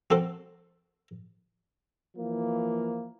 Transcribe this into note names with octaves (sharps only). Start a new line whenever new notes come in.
C4 F#4 A4 C5
E3 F3 A#3